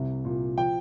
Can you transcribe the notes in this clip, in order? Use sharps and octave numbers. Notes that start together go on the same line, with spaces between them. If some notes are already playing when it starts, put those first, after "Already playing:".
Already playing: C2 C3
A#2
F3 G5